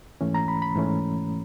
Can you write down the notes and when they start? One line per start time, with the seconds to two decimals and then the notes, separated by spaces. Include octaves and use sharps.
0.21 G#2 E3 A3 C#4
0.34 A#5
0.48 B5
0.62 B5
0.76 G#2 E3 A3 C#4